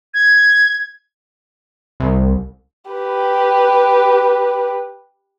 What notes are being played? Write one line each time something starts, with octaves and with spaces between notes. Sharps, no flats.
G#6
C2
G4 B4